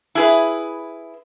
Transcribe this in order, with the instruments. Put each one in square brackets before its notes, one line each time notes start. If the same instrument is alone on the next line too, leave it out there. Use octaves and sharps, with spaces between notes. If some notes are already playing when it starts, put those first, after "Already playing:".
[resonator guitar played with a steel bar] E4 G#4 B4